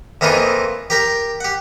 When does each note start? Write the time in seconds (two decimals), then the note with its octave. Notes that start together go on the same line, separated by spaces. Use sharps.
0.21 F2 E3 A#3 D#4 F4
0.90 G4 A#4 G5
1.41 G4 F#5